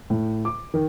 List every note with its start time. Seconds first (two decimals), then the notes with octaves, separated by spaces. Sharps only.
0.10 A2
0.45 D6
0.74 D#3